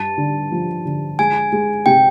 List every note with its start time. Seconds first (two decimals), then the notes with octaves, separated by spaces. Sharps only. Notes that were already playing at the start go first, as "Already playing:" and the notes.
Already playing: G2 A5
0.18 D3
0.52 F3
0.85 D3
1.19 G#3 G#5
1.52 G#3
1.86 C3 G5